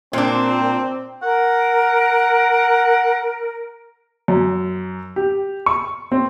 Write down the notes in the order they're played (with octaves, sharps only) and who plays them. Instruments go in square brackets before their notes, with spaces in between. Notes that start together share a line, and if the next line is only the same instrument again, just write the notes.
[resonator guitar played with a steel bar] A#2 D4 [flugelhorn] C4
[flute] A#4 [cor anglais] F#5
[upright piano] F#2
G4
C#6
C4